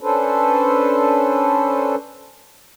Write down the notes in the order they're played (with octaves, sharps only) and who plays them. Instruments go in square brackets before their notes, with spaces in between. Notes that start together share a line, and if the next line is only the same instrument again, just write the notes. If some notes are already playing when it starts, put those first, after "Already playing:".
[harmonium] C#4 D4 A4 B4 C5